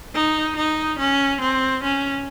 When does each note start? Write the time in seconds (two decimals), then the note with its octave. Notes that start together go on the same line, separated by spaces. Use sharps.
0.14 D#4
0.56 D#4
0.99 C#4
1.41 C4
1.84 C#4